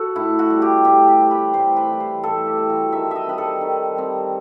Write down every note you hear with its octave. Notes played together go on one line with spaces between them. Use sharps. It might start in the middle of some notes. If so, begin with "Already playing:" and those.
Already playing: F#4 A4
A2 E4
F#4
G3 C4
G4
A2 G4
G4
G3 C4
B4
A2 C5
B4
E3 G3
C5
A2 A4
G4
E3 G3
F#4
D#3 E5
D#5 E5
G3 C4 B4
A4
D#3
G3 C4